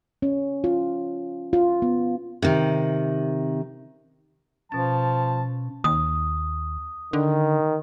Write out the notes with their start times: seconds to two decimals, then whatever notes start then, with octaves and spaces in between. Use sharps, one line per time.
0.22 C#4
0.64 F4
1.53 F4
1.82 B3
2.42 C3 D#3
4.72 B2 F3 C#4 A5 A6
5.84 D#2 D#6
7.13 D3 D#3